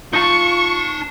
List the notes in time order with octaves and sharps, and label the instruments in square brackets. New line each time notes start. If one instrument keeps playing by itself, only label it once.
[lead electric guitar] D#4 A5 [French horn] F4 [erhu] C#6